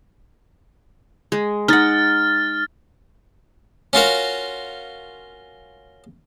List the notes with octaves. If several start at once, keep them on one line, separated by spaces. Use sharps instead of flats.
G#3
D#4 F#5 F6 A6
C#4 F4 F#4 A#4